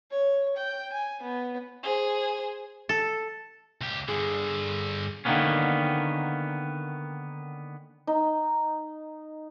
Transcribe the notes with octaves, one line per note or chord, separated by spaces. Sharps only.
C#5
G5
G#5
B3
G#4 C5
A4
C#2 G4
G2 D3 G#4
D3 D#3 F#3 A#3 B3 C#4
D#4